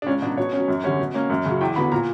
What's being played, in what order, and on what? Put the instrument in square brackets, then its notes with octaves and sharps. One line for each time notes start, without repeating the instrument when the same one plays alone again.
[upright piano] D4
C#2 C#4
B2 F#3 D4
B2 C#5
F#3 C#4
F#2
D3 G3 C#4
B2
A#3 C#4
F#2
C#3 F#3
E2 G5
D3 F#3 B3 B5
A#2 A#5